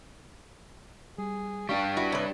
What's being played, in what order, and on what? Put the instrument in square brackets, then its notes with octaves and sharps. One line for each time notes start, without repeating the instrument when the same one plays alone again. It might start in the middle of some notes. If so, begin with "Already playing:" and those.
[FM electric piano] G3 [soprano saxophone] G#4
[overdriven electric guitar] G3 D4 [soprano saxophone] F5 [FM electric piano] C#6
[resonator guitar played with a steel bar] E4 F#4
[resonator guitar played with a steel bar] C3 B4 [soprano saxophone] C#5